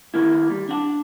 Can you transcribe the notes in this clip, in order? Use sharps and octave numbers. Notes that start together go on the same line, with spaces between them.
D#3 A#3 E4
G3
D4 F#5 A5